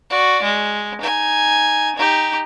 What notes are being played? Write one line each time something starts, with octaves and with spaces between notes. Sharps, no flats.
F#4 D5
G#3
D#4 G#5
D#4 G4